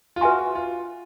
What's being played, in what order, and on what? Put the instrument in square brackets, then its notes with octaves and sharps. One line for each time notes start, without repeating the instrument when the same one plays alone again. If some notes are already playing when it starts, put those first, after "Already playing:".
[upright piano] F4
[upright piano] F#4 [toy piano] B4 E5 G#5 C6
[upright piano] F4